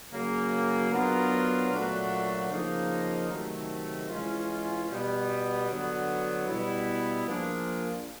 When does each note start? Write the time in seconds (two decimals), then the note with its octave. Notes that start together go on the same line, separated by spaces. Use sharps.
0.11 C#3 F#3 A#3
0.90 F#3 B3 D4 F4 A#4
1.69 A#2 F#3 A3 D4 F#4
2.49 C#3 F3 A#3 D#4
3.29 C3 D#3 F#3 A3
4.08 E3 G#3 C#4 F4
4.88 B2 G3 B3
5.67 D3 F#3 B3
6.47 B2 G3 B3 E4
7.26 F3 A#3 D4 F4 G#4